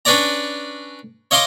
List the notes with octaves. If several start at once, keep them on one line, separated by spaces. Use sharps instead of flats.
C#4 D4 B4 C#5 D5 A#5
C#5 D#5 F5 A#5 C6 D6